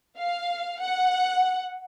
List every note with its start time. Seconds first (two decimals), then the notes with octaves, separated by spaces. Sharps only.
0.18 F5
0.81 F#5